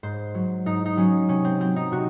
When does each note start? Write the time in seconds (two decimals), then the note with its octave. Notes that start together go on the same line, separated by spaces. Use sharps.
0.03 G#2 C5
0.35 F#3
0.66 G#2 D#4
0.86 D#4
0.97 F#3 C#4
1.28 C3 C#4
1.45 C4
1.60 F#3 C4
1.76 D#4
1.92 C3 F#4